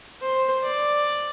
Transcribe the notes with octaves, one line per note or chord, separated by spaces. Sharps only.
C5
D5